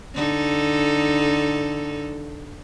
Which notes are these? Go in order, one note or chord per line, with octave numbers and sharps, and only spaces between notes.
D3 D#4 A4